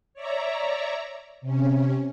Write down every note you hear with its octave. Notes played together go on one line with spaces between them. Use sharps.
C#5 D5 E5 A#5
C3 C#4